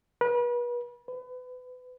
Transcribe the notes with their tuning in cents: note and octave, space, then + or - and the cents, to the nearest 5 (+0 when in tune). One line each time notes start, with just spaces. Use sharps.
B4 -35
B4 +30